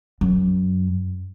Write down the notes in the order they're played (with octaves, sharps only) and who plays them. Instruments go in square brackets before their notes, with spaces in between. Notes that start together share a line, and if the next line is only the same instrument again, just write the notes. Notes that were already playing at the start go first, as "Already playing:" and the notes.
[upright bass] F#2